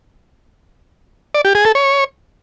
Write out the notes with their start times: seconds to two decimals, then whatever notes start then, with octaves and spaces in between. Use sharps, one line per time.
1.35 D5
1.45 G4
1.55 G#4
1.65 A4
1.75 C#5